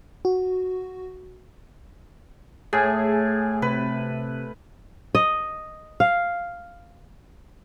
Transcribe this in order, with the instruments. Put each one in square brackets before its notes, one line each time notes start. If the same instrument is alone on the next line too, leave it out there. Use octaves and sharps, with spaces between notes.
[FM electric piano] F#4
[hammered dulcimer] A2 [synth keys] G#4
[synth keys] C3 [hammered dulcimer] B4
[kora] D#5
F5